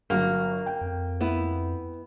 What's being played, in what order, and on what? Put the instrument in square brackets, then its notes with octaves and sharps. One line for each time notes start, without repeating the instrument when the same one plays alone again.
[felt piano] G1 F#3 F#4 [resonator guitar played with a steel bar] A#3
[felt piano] G5
[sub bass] F2
[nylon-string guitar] B3 E4